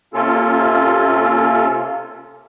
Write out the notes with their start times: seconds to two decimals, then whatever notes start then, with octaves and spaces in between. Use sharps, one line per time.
0.14 C3 A#3 C#4 F4 A4